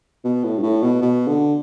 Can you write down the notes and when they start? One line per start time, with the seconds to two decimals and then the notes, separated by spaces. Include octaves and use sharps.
0.24 B2
0.44 A2
0.58 G2
0.62 A2
0.82 B2
1.02 B2
1.27 D3